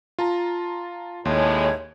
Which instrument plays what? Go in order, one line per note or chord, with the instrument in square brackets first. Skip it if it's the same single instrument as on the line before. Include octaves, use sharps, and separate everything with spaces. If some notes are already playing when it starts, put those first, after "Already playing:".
[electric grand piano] F4 A5 A#5
[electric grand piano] D#2 C6 [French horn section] A2 G#3 [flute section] C#5